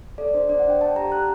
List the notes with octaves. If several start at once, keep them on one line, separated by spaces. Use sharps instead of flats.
A4 D5
D4 C5
D4 D5
F#5
D4 G5
D4 A5
G4 A#5
G4 F#6